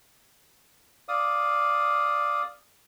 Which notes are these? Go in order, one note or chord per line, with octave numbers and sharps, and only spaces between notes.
D5 F5 D#6